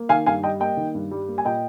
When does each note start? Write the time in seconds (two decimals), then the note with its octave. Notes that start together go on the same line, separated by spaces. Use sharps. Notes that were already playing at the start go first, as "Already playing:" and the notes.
Already playing: A#3
0.09 D#3 F5 G#5
0.26 G2 F5 G#5
0.43 G3 D#5 G5
0.60 A#3 D#5 G5
0.77 D#3
0.95 G2
1.11 G3
1.28 A#3
1.38 G#5
1.45 A#2 D#5 G5